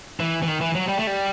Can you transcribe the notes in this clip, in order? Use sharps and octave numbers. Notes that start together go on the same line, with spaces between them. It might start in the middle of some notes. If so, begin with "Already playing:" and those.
E3
E3
D#3
E3
F#3
G3
A3
G3